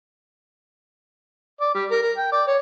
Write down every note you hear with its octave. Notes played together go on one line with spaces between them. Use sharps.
D5
G3
A#4
A#4
G5
D5
C#5